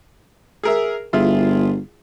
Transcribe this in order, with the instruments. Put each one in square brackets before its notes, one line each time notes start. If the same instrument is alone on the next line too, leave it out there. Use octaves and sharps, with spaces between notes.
[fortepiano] G#4 A#4 E5
[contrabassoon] G1 [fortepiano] E4 F4 G#4